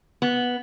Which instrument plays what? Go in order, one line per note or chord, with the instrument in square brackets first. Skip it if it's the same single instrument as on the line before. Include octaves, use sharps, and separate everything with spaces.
[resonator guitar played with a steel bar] B3